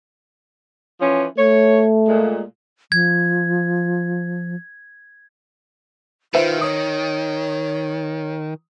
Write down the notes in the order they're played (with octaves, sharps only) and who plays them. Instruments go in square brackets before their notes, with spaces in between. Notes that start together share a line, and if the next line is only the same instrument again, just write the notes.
[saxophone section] E3 F3 C#4
[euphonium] A3 [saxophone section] C#5
[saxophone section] A#2 G#3
[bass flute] F3 [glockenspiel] G#6
[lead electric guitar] D#3 [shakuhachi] F4 [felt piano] B4 C5 E5
[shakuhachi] C#5 [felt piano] D#6